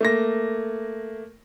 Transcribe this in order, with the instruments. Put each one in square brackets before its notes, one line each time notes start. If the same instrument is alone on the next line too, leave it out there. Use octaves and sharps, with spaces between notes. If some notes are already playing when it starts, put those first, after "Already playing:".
[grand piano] A3 A#3 A#6